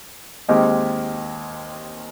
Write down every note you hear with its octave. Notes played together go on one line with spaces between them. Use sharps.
D#2 D#3 G#3 C4 G4